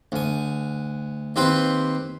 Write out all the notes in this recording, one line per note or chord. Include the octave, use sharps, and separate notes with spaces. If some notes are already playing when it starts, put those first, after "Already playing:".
D2 G#5
D#2 C4 G4 B4 C5 C6